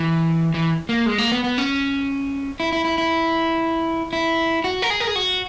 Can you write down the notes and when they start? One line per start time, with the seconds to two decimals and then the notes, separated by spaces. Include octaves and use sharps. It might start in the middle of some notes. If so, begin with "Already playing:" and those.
Already playing: E3
0.54 E3
0.89 A#3
1.06 G#3
1.18 A#3
1.32 B3
1.44 B3
1.58 C#4
2.60 E4
2.73 E4
2.85 E4
2.98 E4
4.13 E4
4.64 F#4
4.82 A#4
4.90 G#4
5.00 A#4
5.07 G#4
5.16 F#4